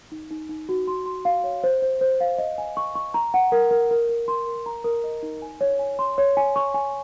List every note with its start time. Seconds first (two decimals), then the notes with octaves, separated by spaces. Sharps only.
0.12 D#4
0.31 D#4
0.49 D#4
0.69 F#4
0.87 C6
1.06 C6
1.25 F5
1.44 C#5
1.63 C5
1.82 C5
2.01 C5
2.20 F5
2.38 D#5
2.58 G#5
2.77 C#6
2.95 C#6
3.14 A#5
3.34 F#5
3.52 A#4
3.71 A#4
3.91 A#4
4.09 A#4
4.28 C6
4.46 A#4
4.66 A#5
4.84 A#4
5.04 D#5
5.23 D#4
5.42 G#5
5.61 C#5
5.79 G#5
5.99 C6
6.18 C#5
6.37 G#5
6.56 C#6
6.74 G#5